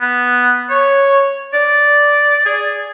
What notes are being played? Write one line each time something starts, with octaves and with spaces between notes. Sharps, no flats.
B3
C#5
D5
G#4